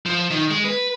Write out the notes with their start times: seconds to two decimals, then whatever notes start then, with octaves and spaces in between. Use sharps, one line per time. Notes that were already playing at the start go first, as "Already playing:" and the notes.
0.06 F3
0.31 D#3
0.51 G#3
0.65 B4